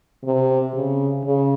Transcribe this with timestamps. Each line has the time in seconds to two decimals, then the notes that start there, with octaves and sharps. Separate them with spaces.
0.24 C3
0.74 C#3
1.24 C#3